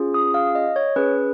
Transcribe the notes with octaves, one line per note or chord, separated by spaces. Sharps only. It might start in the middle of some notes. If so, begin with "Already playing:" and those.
Already playing: C#4 F4 G#4
D#6
F5
D#5
C#5
C#4 G#4 B4